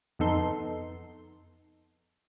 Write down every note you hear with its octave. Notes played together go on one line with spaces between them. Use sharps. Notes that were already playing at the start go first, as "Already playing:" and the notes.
F2 B3 D#4 A4 C6